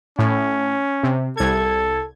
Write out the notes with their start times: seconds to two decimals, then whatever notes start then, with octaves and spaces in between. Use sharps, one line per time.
0.19 A2 C#4
1.03 C3
1.37 C2 A4 G#6